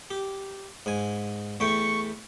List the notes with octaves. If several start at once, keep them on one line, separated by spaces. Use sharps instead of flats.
G4
G#2 G#5
E2 A3 G5 C#6